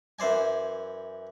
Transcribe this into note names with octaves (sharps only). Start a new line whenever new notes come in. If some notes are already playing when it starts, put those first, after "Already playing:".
F#2 E3 C5 D5 G#5